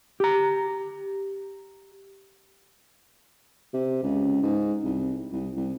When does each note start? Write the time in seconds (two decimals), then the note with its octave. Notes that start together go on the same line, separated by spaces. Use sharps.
0.20 G4 A#5
3.74 C3
4.03 C#2
4.43 G#2
4.84 C2
5.32 C2
5.57 C2